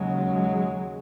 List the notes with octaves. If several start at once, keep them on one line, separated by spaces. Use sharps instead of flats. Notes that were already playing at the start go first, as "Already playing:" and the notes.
Already playing: D#2 C#3 F#3 G#3